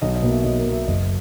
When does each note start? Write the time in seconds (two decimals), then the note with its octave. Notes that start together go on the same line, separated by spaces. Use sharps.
0.02 B1 D#5
0.16 D#5
0.22 B2 F#3 A#3
0.30 E5
0.44 B1 D#5
0.59 A#4
0.66 B2 F#3 A#3
0.73 E5
0.87 F#1 D#5